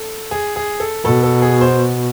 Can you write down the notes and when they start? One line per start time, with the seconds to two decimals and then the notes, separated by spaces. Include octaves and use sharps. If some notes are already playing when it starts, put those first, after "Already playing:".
Already playing: A4
0.31 G#4
0.56 G#4
0.80 A4
1.05 B2 A4
1.23 A4
1.42 G#4
1.61 C5